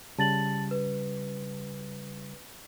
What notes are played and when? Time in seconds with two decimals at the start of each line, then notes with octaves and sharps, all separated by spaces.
0.18 C#3 G3 A5 A6 F#7
0.71 B4